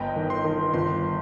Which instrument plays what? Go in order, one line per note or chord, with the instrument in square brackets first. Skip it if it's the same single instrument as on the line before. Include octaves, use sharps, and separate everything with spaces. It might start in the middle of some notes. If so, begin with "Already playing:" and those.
Already playing: [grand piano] G1 B3 [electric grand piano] D#5 G5
[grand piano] D#3
[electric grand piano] C6
[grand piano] D#3
[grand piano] G1 [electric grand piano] C6